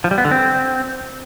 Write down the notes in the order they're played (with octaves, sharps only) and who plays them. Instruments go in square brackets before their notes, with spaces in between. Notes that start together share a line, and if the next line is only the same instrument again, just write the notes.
[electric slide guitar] F3
G3
B3
D3
C4